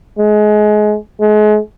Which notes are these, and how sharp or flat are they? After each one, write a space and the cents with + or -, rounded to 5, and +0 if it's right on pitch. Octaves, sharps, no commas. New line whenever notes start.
G#3 +25
G#3 +35